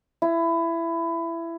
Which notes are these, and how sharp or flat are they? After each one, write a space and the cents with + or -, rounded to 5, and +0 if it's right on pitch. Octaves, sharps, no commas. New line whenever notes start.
E4 +20